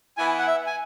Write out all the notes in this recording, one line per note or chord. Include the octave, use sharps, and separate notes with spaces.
E3 B3 E4 G#5
F#5
E5
G#5